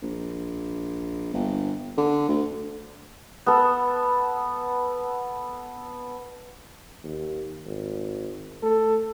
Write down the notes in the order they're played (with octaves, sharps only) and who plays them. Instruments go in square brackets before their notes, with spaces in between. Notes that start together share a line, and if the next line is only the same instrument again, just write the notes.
[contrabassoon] A#1
G1
D3
D2
[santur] B3 A4
[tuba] D#2
G#1
[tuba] A3 [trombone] A4